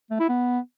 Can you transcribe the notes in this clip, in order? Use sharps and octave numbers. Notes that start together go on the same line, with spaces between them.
A3
E4
B3